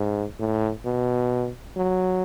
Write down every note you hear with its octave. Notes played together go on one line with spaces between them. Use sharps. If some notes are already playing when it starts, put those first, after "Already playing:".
Already playing: G#2
A2
B2
F#3